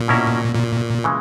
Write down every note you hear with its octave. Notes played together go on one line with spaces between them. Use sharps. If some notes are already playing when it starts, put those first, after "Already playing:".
Already playing: A#2
B2 A#3 C#4 E4 A#4
A#2
C#3 E3 G#3